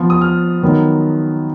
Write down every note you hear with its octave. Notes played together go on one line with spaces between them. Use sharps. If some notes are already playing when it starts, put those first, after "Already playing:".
Already playing: F3 B3
D#6
F6
D#3 F#3 B3